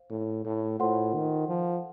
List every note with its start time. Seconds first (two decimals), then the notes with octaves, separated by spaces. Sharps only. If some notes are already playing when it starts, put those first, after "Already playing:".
Already playing: C5 F5
0.10 A2
0.45 A2
0.79 A2 F4 A4 C5 F#5 C6
1.14 D#3
1.49 F3